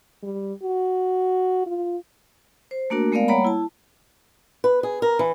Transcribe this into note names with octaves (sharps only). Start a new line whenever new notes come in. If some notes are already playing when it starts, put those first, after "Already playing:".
G3
F#4
F4
C5
A3 A#3 D4 F#4 A#4
G#3 A3 B3 A#4 D5 F5
G3 A#3 C#5 F#5 A#5 B5
E4 A5
B4
G#4
A#4
E3